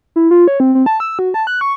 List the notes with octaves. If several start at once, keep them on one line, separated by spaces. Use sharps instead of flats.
E4
F4
C#5
C4
C4
A5
E6
F#4
A5
F#6
C#6